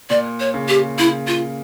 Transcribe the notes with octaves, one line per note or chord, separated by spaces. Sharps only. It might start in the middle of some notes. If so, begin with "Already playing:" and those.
A#2 D5
C#5
C#3
G4
C#3 E4
F4